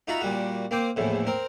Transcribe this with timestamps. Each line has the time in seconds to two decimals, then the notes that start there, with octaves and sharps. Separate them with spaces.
0.08 D#4 F4 F#4 E5 A#5 B5
0.21 A#2 G3 F#4
0.71 A#3 C4 C5 D6
0.96 A#1 E2 A2
1.27 C4 A#4